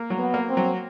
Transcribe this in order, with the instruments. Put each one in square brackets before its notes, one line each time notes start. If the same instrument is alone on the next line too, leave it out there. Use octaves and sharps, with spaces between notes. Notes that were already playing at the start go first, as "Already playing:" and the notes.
Already playing: [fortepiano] A#3
F#3
[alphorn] B3
[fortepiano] A#3
[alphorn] C4
[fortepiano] F#3